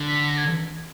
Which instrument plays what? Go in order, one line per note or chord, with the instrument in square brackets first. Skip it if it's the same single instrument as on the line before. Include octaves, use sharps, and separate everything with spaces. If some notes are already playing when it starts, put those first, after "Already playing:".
Already playing: [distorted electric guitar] D3
[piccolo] B6
A#6
G#6